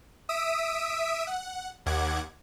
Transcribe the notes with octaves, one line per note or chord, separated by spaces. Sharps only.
E5 D#6 E6 B6 D7 D#7
F#5
D#2 F#5 D6 G#6